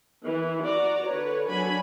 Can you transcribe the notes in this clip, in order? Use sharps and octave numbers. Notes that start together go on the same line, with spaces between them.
E3
F#4 D5 A#5
D3 B4 C#5
F#3 D4 G#5 B5